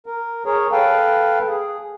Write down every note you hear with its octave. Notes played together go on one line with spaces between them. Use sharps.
A#4
G#4 A#4 C#5
A4 B4 F5 G5
G#4